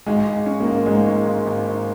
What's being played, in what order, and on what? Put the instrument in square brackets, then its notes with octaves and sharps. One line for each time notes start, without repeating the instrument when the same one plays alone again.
[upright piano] G#1 [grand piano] G#3
[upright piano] G#1
C#4
[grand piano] A#3
[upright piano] G#1
[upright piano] G#2 [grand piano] G#3
[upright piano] G#1
G#1
G#1
G#1